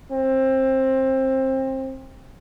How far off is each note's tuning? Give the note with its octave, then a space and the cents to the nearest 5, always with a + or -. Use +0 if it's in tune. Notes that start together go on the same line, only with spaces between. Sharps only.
C4 +20